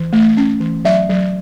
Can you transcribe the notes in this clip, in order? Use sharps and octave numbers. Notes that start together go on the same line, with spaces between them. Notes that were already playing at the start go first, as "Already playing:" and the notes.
Already playing: E3
A3
C#4
E3
F#3 E5
F#3